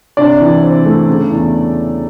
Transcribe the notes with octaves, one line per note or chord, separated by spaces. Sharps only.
C3 D4 D5
E3
C4
A3
C#3
E2